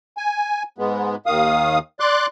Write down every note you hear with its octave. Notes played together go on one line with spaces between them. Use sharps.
G#5
G#2 G#3 B3
D#2 D#3 F5 D#6
D5 C6 D6 F#6